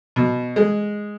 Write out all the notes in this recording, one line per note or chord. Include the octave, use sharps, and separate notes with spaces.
B2
G#3